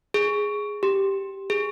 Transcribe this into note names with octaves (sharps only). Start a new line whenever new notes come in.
G#4
G4
G#4